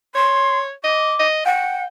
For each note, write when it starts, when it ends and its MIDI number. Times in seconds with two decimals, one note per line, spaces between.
0.15 0.72 73
0.15 0.59 84
0.84 1.14 75
0.84 1.26 86
1.19 1.42 75
1.45 1.81 78
1.45 1.85 79